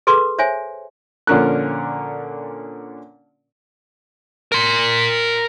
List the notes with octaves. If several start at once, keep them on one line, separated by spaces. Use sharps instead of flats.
G#4 A4 B4 C6 D6 E6
C5 C#5 E5 G#5
A#2 D3 F3 C#4 A#4 F#6
A#4 C6